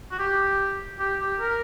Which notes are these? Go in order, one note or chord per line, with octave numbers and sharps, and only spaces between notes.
F#4
G4
G4
G4
A#4